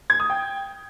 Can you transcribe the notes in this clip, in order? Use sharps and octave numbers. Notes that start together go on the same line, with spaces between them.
G#6
D#6
G5